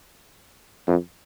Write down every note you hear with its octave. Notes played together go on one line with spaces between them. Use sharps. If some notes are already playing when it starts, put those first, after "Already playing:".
F2